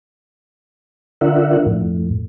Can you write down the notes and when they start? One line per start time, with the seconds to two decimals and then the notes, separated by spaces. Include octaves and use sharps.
1.21 D3 D4 F4 A#4 E5 F#5
1.65 F2 A2